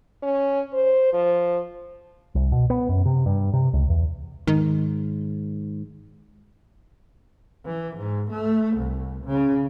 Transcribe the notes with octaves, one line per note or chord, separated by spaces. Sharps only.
C#4
C5
F3
C2
B2
B3
F#2
C3
G2
C3
C#2
E2
G#2 D#3
E3
G#2
A3
C2
C#3